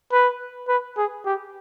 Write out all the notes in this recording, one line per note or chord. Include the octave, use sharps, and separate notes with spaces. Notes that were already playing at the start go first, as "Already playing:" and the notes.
B4
B4
G#4
G4